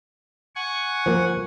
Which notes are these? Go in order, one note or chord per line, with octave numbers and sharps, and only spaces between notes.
F#5 G#5 C#6
F3 A#3